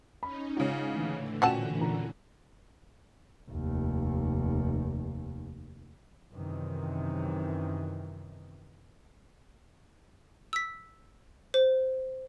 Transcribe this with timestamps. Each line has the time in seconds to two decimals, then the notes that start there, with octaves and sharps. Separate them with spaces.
0.23 C#4 D#4 B5
0.57 G#2 C#3 F4 C#5
0.91 A2 D3 E3
1.42 A#2 C4 C#4 F#4 F#5 G5 A5 E7
1.78 E1 A#2 A#5
3.51 F1 D#2
6.32 F#2 C3 D#3 E3
10.53 E6 B6
11.54 C5